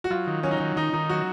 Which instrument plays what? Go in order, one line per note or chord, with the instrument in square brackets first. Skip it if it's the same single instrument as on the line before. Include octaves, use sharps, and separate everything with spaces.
[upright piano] F#4
[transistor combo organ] F#3 [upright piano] F4
[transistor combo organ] D#3
[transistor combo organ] F#3 [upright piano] C#4
[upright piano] D#4
[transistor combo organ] D#3 [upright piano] C#4
[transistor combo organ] D#3 [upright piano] D#4
[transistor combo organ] D#3 [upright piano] D#4
[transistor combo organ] F#3 [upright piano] F#4